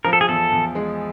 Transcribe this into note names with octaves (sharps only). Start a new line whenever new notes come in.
F3 A#4
A4
G#4
E2 A4
E2
G#3